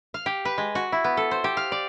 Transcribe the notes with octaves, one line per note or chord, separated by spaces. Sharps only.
F5
G4
B4
G#3
F#4
E4
B3
A4
C5
G4
F5
D5